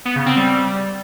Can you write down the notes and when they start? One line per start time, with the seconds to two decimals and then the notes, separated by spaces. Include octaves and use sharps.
0.05 B3
0.16 C#3
0.26 C4
0.37 G3